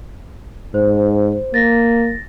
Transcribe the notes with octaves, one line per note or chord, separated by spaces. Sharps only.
G#2 C5
A#3 A6 A#6